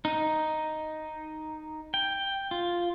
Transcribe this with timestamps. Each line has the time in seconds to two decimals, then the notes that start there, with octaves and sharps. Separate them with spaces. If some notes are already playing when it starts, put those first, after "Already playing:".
0.05 D#4
1.94 G5
2.51 F4